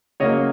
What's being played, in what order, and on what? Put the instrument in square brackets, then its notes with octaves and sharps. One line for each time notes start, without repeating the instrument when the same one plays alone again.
[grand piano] C#3 F#3 A#3 C#5 D#5